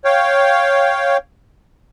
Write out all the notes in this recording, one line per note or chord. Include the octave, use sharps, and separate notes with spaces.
C#5 F5 G5